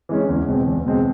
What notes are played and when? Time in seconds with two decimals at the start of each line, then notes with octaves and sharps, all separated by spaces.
0.09 E3 G#3 C#4
0.29 E2
0.48 B2 G#3 C4
0.67 E2
0.86 B2 G#3 C4